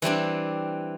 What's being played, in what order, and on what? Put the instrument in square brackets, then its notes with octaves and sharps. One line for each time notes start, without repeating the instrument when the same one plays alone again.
[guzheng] E3 G3 C4 D4